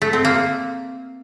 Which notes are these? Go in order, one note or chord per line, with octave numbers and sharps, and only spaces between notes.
A3
C4
A#3